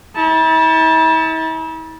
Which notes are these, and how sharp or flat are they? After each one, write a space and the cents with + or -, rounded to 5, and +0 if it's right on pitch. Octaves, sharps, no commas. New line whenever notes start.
E4 -45 A5 +0